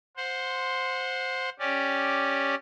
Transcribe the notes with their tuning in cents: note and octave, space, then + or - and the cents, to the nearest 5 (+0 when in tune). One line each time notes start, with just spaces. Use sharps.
C5 +0 F#5 -30
C#4 +0 G4 +0 D5 +5